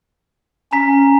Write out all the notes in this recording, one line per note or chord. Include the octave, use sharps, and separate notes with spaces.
C#4 A#5 B6